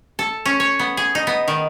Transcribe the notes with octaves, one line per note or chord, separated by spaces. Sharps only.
A4
C#4
C#5
B3
G#4
D#4
B3
D#3